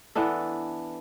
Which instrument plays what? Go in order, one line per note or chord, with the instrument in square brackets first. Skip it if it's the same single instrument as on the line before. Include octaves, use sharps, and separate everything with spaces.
[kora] E3 B3 D4 A4